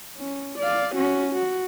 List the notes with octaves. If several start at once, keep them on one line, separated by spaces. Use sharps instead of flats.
C#4
D5 F5
C#4 F#4
F#4